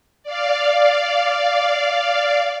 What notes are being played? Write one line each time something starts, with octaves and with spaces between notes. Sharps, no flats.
D5 F5